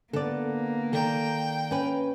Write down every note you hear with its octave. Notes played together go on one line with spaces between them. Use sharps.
D3 A#3 B3 A4 D5
D#3 A4 D5 G5 A#5
C#4 B4